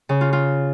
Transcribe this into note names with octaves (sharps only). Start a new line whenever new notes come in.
C#3
F4
F4